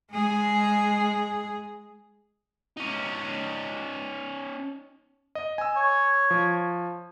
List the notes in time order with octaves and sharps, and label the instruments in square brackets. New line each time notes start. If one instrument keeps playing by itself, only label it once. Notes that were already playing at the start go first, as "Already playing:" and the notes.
[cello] G#3 G#4
[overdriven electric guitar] C#4 D#4
[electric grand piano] D#5
G#5 E6
[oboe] C#5
[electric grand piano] F3